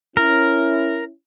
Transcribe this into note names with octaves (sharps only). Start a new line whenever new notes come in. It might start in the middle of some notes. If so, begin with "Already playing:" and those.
C#4 E4 A#4